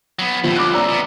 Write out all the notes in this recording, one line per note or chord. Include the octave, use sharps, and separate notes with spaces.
F#3 B3
E2 C3 F3
C2 D6 F#6
D5 A#5 E6
B2